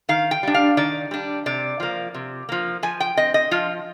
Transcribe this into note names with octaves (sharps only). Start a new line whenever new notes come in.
D#3 F5
G5
G3 D4
F5
D#3 D5
G3 D4
C3 D5
F3 A#3
C3
F3 A#3
F3 G#5
G5
C4 D#5
D#5
F3 F4